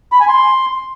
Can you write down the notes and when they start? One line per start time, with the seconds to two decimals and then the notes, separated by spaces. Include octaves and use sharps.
0.12 B5
0.20 G#5
0.28 C6